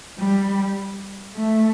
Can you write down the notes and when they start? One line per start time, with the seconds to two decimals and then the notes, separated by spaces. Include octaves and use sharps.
0.19 G3
1.36 A3